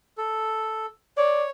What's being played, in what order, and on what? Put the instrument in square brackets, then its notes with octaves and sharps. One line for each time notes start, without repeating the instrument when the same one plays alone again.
[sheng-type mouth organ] A4
[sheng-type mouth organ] C#5 [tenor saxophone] D5